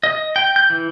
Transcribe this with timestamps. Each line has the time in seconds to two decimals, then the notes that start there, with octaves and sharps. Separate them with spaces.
0.03 D#5
0.36 G5
0.56 G6
0.70 E3